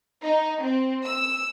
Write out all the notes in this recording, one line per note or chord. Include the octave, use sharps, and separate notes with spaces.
D#4
C4
E6